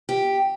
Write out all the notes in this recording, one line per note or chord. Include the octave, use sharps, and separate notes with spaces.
G4